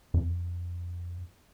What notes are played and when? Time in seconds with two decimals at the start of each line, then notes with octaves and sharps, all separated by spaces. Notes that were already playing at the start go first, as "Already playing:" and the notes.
0.14 F2